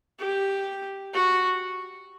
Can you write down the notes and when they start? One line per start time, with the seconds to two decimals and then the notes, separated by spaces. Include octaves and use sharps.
0.20 G4
1.14 F#4